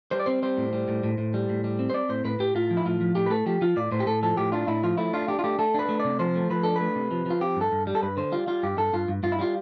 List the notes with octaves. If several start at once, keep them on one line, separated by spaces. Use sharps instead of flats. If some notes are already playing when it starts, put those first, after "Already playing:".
G3 C5
D5
C4 C5
G3 C5
A2
G3
A2
A2
A2
G3
A2
G3
C4
C5
C4 D5
A2 C5
A2 B4
A2 G4
A2 F4
F3
E4
A2 F4
F3
A2 G4
B4
A3 A4
F3 G4
F3 F4
A2 D5
A2 C5
G4
A2 A4
F3 A4
A2 G4
D4 F4
A2 E4
F3 F4
A3 E4
D4 F4
D4 G4
F4
A3 G4
A3 A4
D4 B4
A3
C3 D5
F3 C5
A3
F3 B4
D4 A4
A3 B4
C3
F3
F3 F4
C4 G4
G2
A4
G2
G3
A4
G2 B4
D3 C5
G3 F4
G3 F4
G2 G4
G2 A4
G2 F4
G2
G2 F4
E4
G3 F4